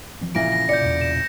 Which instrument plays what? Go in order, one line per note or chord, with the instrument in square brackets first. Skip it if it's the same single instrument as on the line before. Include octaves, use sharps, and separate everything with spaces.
[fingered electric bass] E3 F3 C4
[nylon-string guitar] A#2 C#3 E4 [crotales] A#6 D7
[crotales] A#6
[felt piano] D5 [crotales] G6 C#7
[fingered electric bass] E2 B2
[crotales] E7